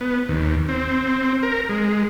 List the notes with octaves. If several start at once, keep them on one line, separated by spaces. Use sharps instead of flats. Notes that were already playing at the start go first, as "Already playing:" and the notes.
B3
D#2
C4
A#4
G#3